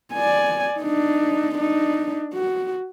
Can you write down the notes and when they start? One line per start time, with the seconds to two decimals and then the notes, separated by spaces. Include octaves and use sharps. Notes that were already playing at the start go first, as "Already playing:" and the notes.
0.13 D5 G#5
0.79 D4 D#4
1.55 D4 D#4
2.34 F#4